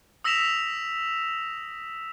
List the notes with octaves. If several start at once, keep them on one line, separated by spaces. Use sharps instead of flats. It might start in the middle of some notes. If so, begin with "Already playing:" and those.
D#6 E6 A#6 B6 E7 F7